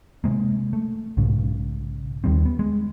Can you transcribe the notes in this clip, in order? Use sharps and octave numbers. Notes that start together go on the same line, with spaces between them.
C3 G#3 A#3
A3
B1 G#2 C#3
D#2 D#3 G3 C4
B3
G#3